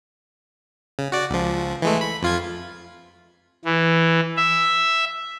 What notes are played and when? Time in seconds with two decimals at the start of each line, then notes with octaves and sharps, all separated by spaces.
0.99 C#3
1.12 F#4 D5
1.30 C#2 F3
1.82 E3 G#3 A3
2.01 B5
2.22 F2 F4 G#6
3.65 E3
4.37 E5